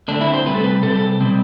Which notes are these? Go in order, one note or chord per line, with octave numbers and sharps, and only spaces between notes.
D3 A3 C4 D4
E4
C5
C3 G3 C4 B4
A4
B4
C3 G3 C4 A4
A4
B2 G3 C4